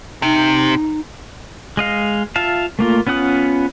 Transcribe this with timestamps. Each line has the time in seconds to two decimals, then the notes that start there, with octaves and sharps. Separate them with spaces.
0.22 C3 D#4
1.77 G#3 D#5 F5
2.36 F4 E5 F5 A5
2.79 A3 A#3 F4
3.07 B3 C#4 F4 F#5 D#6